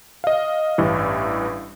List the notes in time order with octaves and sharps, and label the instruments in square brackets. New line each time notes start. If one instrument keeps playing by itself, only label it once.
[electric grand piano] D#5 F5
A1 G2 E3